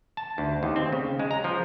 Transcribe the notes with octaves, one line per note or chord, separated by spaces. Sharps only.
A5
D2
D#2
C4
C#3
G#3
A#5
F3